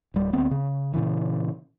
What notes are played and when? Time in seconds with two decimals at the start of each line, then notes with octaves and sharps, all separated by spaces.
0.14 D1 G3
0.33 D2 B3 C4
0.51 C#3
0.94 A#2 C#3 E3